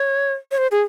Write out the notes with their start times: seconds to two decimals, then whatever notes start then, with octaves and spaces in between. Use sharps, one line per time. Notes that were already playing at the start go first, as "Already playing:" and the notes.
Already playing: C#5
0.51 C#5
0.58 C5
0.72 G#4